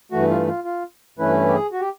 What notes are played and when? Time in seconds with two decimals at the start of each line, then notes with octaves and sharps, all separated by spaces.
0.12 G2 E3 A3 F#4
0.30 F4
0.47 F4
0.65 F4
1.18 G2 E3 A3 C#4 E4 B4
1.48 G4
1.54 G#4
1.72 F#4
1.81 G4